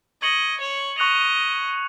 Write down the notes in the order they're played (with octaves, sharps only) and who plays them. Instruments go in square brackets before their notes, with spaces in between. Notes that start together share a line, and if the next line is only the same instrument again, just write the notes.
[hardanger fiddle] D#5 [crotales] C#6 G#6 C#7 F#7
[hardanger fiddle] C#5
[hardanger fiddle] D#5 [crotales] C#6 F#6 C#7 F7